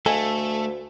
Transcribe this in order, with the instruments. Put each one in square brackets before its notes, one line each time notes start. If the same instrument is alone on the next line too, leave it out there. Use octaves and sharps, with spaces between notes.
[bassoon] D2 [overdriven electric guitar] A3 [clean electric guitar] A4 [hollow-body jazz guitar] D#5 F5 G#5